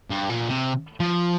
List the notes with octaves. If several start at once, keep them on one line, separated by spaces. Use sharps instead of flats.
G2
A#2
C3
F3